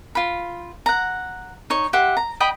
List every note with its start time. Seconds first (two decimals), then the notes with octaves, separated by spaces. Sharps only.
0.15 F4 B5
0.86 F#5 A#5
1.70 D#4 C#5
1.93 G4 E5 F#5 C6
2.17 A#5
2.40 D#5 G5 B5 D#6